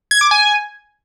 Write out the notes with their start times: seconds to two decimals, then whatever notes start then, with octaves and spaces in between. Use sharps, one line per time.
0.11 G#6
0.21 D6
0.31 G#5